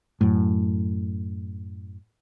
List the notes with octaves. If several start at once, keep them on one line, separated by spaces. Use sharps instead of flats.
F#2 A2